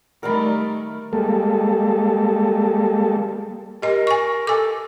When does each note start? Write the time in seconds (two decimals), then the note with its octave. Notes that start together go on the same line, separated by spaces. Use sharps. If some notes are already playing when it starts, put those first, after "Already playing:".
0.23 D#3 G3 A3 A#4 A#5 B5
1.13 G3 G#3 A#3 A4
3.82 G4 A#4 D#5
4.07 G#5 C#6
4.47 A4 G#5 D6